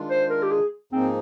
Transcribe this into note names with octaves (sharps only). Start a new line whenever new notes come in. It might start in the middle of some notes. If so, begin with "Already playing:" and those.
Already playing: D#3 G#3 D4 F4
C5
A#4
G4
G#4
G#2 F3 A#3 C4 D#4 G#4